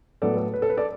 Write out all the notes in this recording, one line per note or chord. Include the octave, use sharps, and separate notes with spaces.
A2 F#3 B3 A4 D5
A4
B4
A4
B4
A4 D5